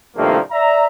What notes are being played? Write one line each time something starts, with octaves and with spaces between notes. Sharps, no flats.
C2 G2 D#3 F3 A3 A#3
D5 E5 A#5